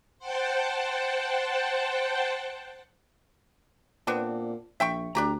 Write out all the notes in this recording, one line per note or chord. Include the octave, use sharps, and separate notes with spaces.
C5 F#5 G5 A5
A#2 B3 C4 D4
A#1 E5 G5 C#6
D2 D4 G4 A#5